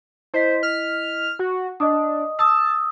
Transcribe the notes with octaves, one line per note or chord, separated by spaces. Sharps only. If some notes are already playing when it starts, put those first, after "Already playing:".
E4 C5 D#5 B6
F6
F#4
D4 D#5 D#6
A5 D#6 E6